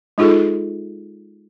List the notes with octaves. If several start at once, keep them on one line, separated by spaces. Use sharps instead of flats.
G#3 D#4 F4 G#4 A4